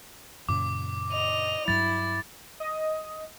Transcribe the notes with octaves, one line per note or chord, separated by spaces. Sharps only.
F#2 A#2 C#3 D6
D#5 F7
G2 F#3 E4 A6
D#5 D#6